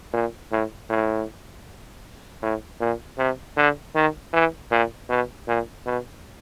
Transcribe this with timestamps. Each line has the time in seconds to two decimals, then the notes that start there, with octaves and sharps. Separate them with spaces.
0.14 A#2
0.52 A2
0.90 A2
2.43 A2
2.80 A#2
3.18 C3
3.57 D3
3.95 D#3
4.33 E3
4.71 A#2
5.10 B2
5.48 A#2
5.86 B2